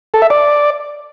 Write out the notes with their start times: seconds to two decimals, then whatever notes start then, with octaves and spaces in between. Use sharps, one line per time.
0.14 A4
0.22 E5
0.30 D5